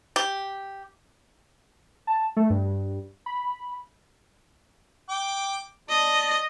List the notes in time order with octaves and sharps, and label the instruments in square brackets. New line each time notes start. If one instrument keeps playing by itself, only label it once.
[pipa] G4
[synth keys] A5
A3
G2
B5
[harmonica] G5 D6
[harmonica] D4 [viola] D#5